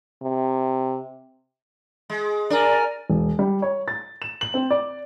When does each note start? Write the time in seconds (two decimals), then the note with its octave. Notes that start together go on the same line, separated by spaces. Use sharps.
0.23 C3
2.10 G#3
2.50 D4 A#4 D5 G#5
3.10 E1
3.39 G3
3.62 C#5
3.88 A6
4.22 E7
4.41 F#7
4.54 C4
4.71 D5